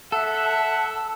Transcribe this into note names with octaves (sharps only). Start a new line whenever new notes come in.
A4 E5 F#5